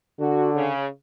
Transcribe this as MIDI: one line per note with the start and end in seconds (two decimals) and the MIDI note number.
0.20 0.70 50
0.20 0.49 66
0.54 0.86 49